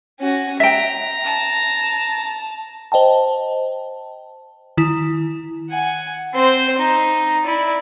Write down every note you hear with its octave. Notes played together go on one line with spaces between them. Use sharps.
C#4 F#4
E5 G5 A#5
A5
C5 D#5 G5 A5
D#3 E4
F#5 G#5
C4 C5
D#4
E4 D5